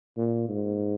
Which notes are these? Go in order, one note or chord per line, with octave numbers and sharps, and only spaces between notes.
A#2
G#2